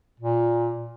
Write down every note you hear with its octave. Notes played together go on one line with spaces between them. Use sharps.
A#2